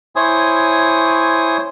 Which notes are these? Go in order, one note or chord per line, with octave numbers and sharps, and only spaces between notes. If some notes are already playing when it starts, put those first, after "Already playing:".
E4 C5 C#5 G#5 D#6